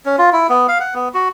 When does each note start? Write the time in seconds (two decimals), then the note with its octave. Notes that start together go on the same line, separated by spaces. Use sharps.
0.06 C#4
0.18 F4
0.33 E4
0.49 B3
0.68 F5
0.80 F#5
0.94 B3
1.14 F#4